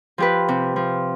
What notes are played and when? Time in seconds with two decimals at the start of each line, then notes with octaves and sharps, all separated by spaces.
0.18 F3 G4 B4
0.48 C3
0.76 F3